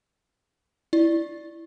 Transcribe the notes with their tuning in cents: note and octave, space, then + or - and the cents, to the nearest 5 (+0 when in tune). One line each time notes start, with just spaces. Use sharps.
E4 +0 D5 +0